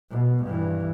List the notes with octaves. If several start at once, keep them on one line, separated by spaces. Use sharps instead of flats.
B2
G2 E3